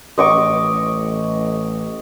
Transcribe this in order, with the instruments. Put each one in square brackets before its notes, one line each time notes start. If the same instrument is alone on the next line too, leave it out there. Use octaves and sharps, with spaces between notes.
[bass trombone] A1 [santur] D#5 C#6 D6